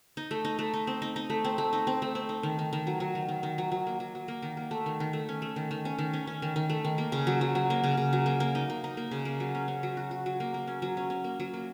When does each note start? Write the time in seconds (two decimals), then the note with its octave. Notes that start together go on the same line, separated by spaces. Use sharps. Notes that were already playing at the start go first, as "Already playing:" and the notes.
0.17 D#4
0.31 A3
0.45 D#4
0.59 A3
0.74 D#4
0.87 C4
1.02 D#4
1.16 D#4
1.30 A3
1.45 C4
1.58 A3
1.73 D#4
1.87 C4
2.02 A3
2.15 C4
2.29 D#4
2.43 D#3
2.59 D#3
2.73 D#3
2.87 F#3
3.00 F#3
3.15 D#3
3.29 D#3
3.43 D#3
3.58 F#3
3.72 F#3
3.87 A#3
4.00 F#3
4.15 F#3
4.28 A#3
4.42 D#3
4.57 A#3
4.71 A3
4.86 D#3
5.00 D#3
5.13 A3
5.29 C#4
5.42 A3
5.56 D#3
5.71 D#3
5.85 C#4
5.98 D#3
6.13 C#4
6.27 C#4
6.42 D#3
6.56 D#3
6.70 A3
6.85 D#3
6.98 A#3
7.12 C#3
7.27 F#3
7.41 F#3
7.55 F#3
7.70 A#3
7.84 C#3
7.97 C#3
8.13 F#3
8.26 A#3
8.40 A#3
8.55 D#4
8.70 A#3
8.84 D#4
8.97 A#3
9.11 C#3
9.25 A#3
9.40 F#3
9.55 C#4
9.68 C#4
9.83 F#3
9.97 F#4
10.11 F#4
10.26 F#3
10.40 A#3
10.54 A#3
10.67 C#4
10.82 F#3
10.97 C#4
11.10 C#4
11.24 A#3
11.40 F#3
11.54 A#3